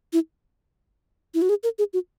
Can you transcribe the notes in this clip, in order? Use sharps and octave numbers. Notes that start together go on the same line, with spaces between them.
E4
E4
F#4
G#4
A#4
G#4
F#4